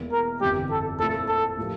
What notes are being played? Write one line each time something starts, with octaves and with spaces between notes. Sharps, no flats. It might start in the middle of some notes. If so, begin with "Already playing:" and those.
Already playing: E1 E2 E3 A#3
A#4
G1 F2 E3 G3 G4
A4
A#2 A3 C4 E4 A4
A4
A2 F3 A#3 E4 G4